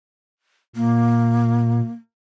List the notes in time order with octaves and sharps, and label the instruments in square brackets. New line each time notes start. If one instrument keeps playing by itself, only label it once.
[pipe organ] A#2 [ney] A#3